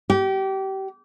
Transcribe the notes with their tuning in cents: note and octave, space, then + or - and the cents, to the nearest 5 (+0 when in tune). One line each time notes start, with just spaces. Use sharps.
G4 -30